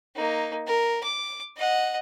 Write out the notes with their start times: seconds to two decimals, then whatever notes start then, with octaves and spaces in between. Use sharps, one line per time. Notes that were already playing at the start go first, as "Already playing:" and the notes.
0.16 A#3 D#4
0.67 A#4
1.03 D6
1.57 D#5 F#5